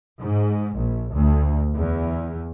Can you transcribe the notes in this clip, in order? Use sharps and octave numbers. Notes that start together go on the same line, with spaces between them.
G#2
A#1
D2
E2